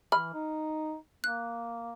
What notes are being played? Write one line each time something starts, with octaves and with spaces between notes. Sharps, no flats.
E3 B5 F6
D#4
A#3 F#6